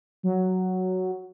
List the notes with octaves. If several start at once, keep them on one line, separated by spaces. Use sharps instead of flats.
F#3